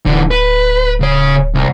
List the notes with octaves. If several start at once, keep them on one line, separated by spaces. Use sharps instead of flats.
D1 D3 E3
B4
C#3 C#5
C2